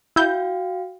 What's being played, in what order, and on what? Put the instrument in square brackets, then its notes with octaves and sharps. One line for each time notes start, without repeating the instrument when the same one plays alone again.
[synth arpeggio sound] E4 G6 [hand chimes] F#4 F5 G5